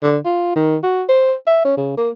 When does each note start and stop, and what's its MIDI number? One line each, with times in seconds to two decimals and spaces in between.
0.03 0.17 50
0.25 0.55 65
0.56 0.77 51
0.83 1.03 66
1.09 1.34 72
1.47 1.60 76
1.65 1.77 61
1.77 1.92 49
1.97 2.10 58